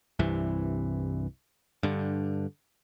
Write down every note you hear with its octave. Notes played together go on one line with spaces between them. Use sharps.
C2 G2 C3 E3
G2 D3